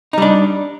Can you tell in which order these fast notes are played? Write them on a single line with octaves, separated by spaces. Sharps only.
D#4 G3 D4